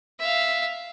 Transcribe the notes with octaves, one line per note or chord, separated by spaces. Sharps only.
E5 F5